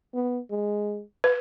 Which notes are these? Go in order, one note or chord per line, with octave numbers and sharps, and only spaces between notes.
B3
G#3
B4